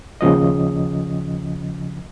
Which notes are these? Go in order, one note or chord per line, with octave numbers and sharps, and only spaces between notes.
D#2 C#3 F3 D#5